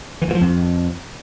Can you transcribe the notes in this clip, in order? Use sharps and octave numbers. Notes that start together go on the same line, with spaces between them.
E3
G2
F3
F2